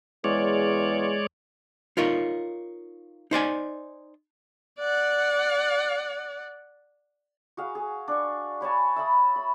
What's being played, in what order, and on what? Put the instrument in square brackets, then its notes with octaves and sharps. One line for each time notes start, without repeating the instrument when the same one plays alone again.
[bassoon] E2 [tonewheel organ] G#3 C#5 D5
[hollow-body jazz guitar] D#4 F4 A#4 C#5
D#4 C5 D5 G#5
[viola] D5 F#5
[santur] F#4 G#4 F5
G#4
D4 C#6
B4 C#5 G#5 A5
E5 A5 B5 D#6
B5